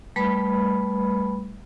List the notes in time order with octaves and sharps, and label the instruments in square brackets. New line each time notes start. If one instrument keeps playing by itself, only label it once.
[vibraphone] G3 A3 B4 B5